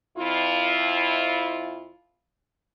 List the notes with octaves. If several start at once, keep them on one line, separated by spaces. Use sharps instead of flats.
F2 E4 F4